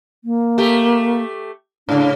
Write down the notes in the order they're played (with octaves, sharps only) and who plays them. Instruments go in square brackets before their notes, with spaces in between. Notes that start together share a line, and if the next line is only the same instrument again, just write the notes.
[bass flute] A#3
[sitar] A3 G4
[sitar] G#2 C#3 [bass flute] D4